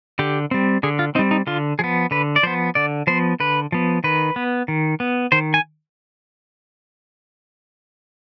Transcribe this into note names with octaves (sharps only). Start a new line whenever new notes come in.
D3 G4
G3 C4
D3 G#4
F4
G3 C4 D#4
D#4
D3 F4
F3 B3 G#4
D3 B4
D5
F3 B3 C5
D3 D5
F3 B3 C5
D3 B4
F3 B3
D#3 B4
B3
D#3
B3
D#3 C5
G#5